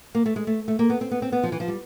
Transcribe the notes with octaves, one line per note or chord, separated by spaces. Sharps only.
A#3
A3
G#3
A3
A3
A#3
B3
C4
B3
C4
B3
F3
E3
F3
G3